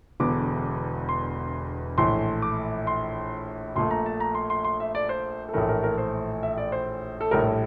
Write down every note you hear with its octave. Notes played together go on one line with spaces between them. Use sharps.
E1 E2 D3 D6
C6
A#1 A2 E3 A3 C6
D6
C6
A#1 A#2 A3 C6
A#5
A5
A#5
C6
C6
C6
E5
D5
C5
A4
A#1 A2 E3 A3 A#4
A#4
A#4
C5
E5
D5
C5
A4
A#1 A2 G3 A#4
A4